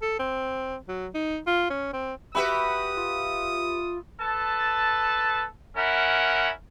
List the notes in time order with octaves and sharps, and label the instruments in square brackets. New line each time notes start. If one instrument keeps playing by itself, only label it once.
[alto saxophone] A4
C4
F#3
D#4
F4
C#4
C4
[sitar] F#4 G4 B4 [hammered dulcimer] E5 B5 [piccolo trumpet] D#6
[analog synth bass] F4
[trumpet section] A4 B4 A5
C#4 E4 A#4 F#5